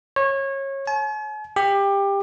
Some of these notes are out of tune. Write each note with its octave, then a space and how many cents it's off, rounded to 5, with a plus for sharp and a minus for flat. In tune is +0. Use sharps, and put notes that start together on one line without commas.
C#5 -25
G#5 +45
G4 +20